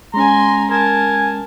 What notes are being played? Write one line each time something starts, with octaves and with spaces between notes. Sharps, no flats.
G#3 C#4 G#5 A#5 C6
A#4 G#5 A5